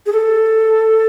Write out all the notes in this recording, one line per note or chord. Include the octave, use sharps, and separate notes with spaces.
G#4
A4